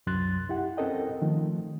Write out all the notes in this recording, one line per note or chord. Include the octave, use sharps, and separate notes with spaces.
C2 F#2 F#3 C6 F#6 A6
E4 G4 F#5
C4 C#4 A4 A#4 D#5 G5
D#3 F3 A3